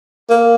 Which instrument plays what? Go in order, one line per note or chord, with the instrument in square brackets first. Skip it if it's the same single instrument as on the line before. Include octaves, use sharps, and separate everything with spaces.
[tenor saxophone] A#3